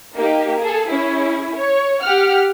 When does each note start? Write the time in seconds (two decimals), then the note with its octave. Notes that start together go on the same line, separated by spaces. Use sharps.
0.15 A#3 D#4 G4
0.60 G#4 A4
0.89 C#4 E4 G#4
1.56 C#5
2.03 G4 F#5 F6